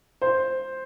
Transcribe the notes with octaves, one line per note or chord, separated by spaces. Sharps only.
C5